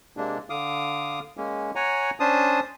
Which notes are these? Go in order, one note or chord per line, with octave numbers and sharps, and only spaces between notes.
C3 G#3 A#3 D4
D3 F5 D6 D#6
G#3 A#3 C#4
C#5 F#5 G#5 A#5
C#4 D4 C5 A5 D#6